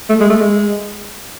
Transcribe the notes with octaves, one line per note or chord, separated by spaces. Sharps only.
A3
G#3
A3
G#3